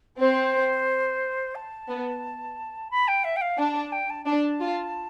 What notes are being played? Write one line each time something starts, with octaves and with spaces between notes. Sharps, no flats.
C4 C5
A5
B3
B5
G5
E5
G5
F5
D4 A5
A5
G5
A5
D4 A5
F4